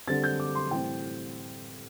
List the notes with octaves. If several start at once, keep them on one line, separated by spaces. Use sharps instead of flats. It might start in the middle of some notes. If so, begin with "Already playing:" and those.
D3 G3 C4 A6
G6
D6
C6
A2 E3 G3 C4 G5